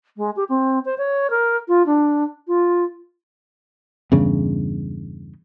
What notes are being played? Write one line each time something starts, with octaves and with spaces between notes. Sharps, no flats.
G#3
G4
C4
C5
C#5
A#4
F4
D4
F4
E2 G2 C#3